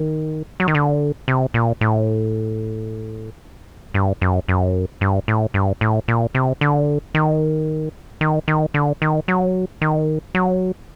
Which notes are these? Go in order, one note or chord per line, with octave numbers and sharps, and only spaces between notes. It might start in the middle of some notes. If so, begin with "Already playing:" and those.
Already playing: D#3
F#3
D#3
D3
C3
A#2
A2
G2
F#2
F#2
G2
A2
G2
A2
A#2
C3
D3
D#3
D#3
D#3
D3
D#3
F#3
D#3
F#3